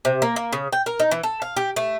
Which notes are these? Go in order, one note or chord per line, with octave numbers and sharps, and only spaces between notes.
C3
A#3
A#3
C#3
G5
A#4
D#4
E3
A4
F5
G4
A3